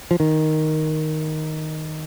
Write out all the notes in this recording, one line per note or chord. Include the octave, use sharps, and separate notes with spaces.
F3
D#3